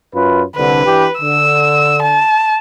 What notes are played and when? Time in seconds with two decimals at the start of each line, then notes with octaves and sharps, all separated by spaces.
0.15 F#2 F4 B4
0.56 C2 D3 B4
0.86 E3 D4 G4
1.21 D3 E6
2.02 A5